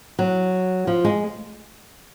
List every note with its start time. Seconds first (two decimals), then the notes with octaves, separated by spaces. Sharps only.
0.19 F#3
0.87 F3
1.05 G#3